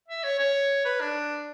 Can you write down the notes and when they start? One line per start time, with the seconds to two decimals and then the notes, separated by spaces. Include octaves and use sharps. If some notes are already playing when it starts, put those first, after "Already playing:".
0.08 E5
0.24 C#5
0.39 C#5
0.85 B4
1.01 D4